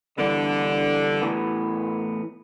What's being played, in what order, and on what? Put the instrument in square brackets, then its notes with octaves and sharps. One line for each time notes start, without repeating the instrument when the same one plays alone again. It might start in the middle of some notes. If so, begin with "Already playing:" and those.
[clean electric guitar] G2 E3 B3 [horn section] D3
[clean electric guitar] A2 E3 B3